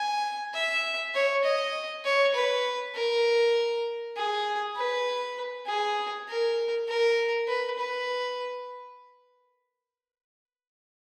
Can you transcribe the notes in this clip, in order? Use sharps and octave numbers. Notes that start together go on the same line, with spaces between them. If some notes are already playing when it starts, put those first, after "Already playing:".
Already playing: G#5
E5
C#5
D#5
C#5
B4
A#4
G#4
B4
G#4
A#4
A#4
B4
B4